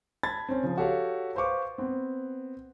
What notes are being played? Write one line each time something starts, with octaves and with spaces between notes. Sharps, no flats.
A5 B5 G#6 A6
C4 C#4
C#3 F3
F#4 G4 A4 C#5 F5
B4 C5 F5 C#6 D6
B3 C4